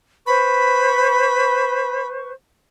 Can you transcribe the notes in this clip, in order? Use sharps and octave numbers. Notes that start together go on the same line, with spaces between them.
B4 C5 B5 C#6